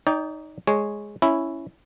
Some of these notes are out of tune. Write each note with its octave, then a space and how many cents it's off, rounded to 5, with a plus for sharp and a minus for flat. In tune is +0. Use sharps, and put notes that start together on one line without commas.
D#4 +0 D5 -40 G5 +10
G#3 +0 C#5 +0
C#4 +0 E4 +0